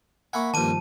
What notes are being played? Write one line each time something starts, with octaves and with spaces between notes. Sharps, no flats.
A#3 E5 F#5 G#5 B5 C#6
G2 A#2 D#3 F3 D4 A5 D#7